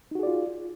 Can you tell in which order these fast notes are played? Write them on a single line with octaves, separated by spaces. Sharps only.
D#4 F#4 G#4 D5 F4